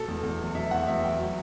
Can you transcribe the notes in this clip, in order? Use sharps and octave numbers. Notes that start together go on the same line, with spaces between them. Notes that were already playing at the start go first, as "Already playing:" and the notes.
Already playing: B2 A4
E2
E2
F#3
B2 E5
E2 F#5
E2 E5
F#3 G5
F#3